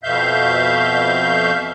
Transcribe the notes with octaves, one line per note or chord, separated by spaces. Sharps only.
F2 B2 E5 F5 G6